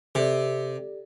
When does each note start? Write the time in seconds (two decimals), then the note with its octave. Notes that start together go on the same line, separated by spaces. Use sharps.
0.15 C3 G4 A4 D5